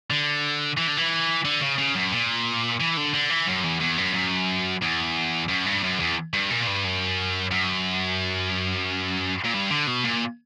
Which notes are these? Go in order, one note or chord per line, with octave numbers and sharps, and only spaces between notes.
D3
E3
D3
E3
D3
C#3
C#3
F#2
A#2
E3
D3
D3
E3
F#2
E2
E2
F#2
F#2
E2
F#2
G2
F#2
E2
G2
A#2
G2
F#2
F#2
A#2
G2
D3
B2
A#2